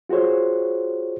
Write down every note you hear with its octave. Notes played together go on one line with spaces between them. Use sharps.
F4 F#4 G#4 C5 C#5